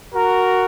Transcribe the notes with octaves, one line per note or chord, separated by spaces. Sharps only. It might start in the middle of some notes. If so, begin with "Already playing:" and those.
F#4 A#4